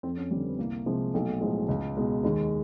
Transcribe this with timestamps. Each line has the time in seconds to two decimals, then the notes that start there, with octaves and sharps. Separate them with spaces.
0.03 F2 C4
0.17 C#4
0.31 G3 C4
0.35 D3
0.44 B3
0.59 C2 A#3
0.86 C3 F3 G#3
1.14 B1 A3
1.41 A2 F3 G#3
1.68 C#2
1.97 B2 G#3
2.24 D#2 G#3